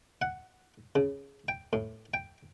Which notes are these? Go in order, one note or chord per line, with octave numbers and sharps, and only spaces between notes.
F#5
C#3
G5
A2
G5